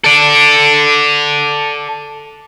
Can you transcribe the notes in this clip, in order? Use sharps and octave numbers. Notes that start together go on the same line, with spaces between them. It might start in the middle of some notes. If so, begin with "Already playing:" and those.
A4 D5